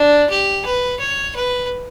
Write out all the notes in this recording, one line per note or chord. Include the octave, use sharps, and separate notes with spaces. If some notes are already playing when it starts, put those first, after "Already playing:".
Already playing: D4
G4
B4
C#5
B4